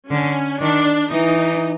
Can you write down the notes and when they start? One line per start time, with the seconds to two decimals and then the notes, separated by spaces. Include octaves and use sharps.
0.11 D3 C#4
0.61 D#3 D4
1.11 E3 D#4